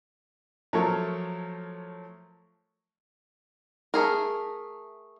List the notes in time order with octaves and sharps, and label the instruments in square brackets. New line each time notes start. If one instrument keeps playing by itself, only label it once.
[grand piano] F3 F#3 A3 A4 A#4 C#5
[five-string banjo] A3 G#4 A#4